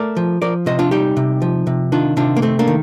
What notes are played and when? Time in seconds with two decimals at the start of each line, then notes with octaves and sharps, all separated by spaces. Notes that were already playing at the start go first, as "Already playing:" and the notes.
Already playing: A3 A#4 D5
0.17 F3
0.42 F3 A#4 D5
0.66 C3 C5 D#5
0.79 D4 F4
0.91 G3 D#4 G4
1.17 C3
1.42 F3
1.67 C3
1.92 D#3 D4 F4
2.17 C3 D4 F4
2.37 A#3
2.42 A3 C4
2.59 A#3 D4
2.68 D#3